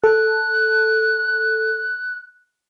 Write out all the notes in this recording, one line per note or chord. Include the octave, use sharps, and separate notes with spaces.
A4 F#6